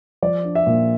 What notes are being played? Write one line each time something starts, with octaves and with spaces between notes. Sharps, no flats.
F3 D5
D4
E5
A#2